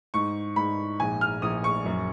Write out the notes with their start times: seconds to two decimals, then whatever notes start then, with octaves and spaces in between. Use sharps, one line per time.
0.14 G#2 C#6
0.56 G#2 B5
0.99 A#1 G#5
1.21 F6
1.42 A#1 D#6
1.64 C#6
1.85 F#2